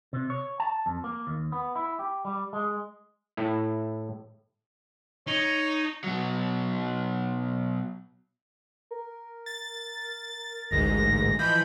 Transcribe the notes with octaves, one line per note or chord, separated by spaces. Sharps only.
C3
C#5
A5
F2
A#3
D#2
B3
E4
G4
G3
G#3
A2 E4
D#4 C#5
B2 F#3
A#4
A6
A1 D2 G#2 A#6
E3 F3 D#5 B5 G6